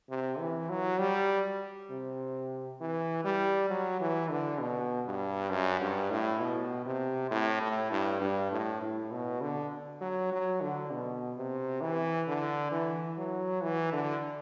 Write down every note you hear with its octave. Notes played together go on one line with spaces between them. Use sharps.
C3
E3
F#3
G3
C3
E3
G3
F#3
E3
D3
B2
G2
F#2
G2
A2
B2
C3
A2
A2
G2
G2
A2
A2
B2
D3
F#3
F#3
D3
B2
C3
E3
D3
E3
F#3
E3
D3